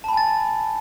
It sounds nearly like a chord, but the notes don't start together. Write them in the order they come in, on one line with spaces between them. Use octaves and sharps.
A5 B5 G#5 A6